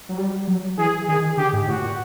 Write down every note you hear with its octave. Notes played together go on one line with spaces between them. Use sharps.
F#3
G3
F#3
E3 G#4
D#3 G#4
D3 G4
G#2
A2 F#4
A#2